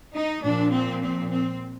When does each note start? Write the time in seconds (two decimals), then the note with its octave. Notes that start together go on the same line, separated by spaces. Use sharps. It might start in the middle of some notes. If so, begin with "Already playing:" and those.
0.14 D#4
0.43 A#2 F3 D4
0.72 C4
1.01 C4
1.31 C4